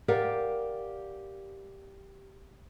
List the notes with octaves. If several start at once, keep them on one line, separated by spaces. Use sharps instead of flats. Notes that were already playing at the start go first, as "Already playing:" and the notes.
G4 A#4 D5 F5 F#5